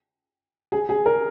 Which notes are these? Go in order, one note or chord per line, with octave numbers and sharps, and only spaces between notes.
G#4
G#4
A#4